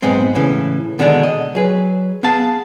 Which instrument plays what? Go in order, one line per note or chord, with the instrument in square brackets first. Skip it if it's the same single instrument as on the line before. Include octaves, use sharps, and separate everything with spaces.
[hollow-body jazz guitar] B1 G#2 G#3 B3 C4
A2 C#3 E3
B2 D3 D#3 G#3 C#4 D4
D#5
F#3 G#4 B4
B3 G#4 F5 A5